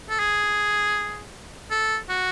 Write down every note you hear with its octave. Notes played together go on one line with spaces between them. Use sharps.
A4
G#4
A4
F#4